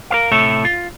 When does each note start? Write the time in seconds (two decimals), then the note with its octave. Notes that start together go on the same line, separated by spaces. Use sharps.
0.10 A#4 C5 F5
0.32 A2 C3 A3 A4 C#5 E5
0.65 F4